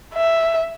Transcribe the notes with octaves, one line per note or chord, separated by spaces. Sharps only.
E5